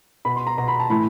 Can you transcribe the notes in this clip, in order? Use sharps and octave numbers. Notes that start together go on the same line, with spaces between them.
B2 B5
C6
A#5
B2 A#5
B5
A5
A2 E3 B5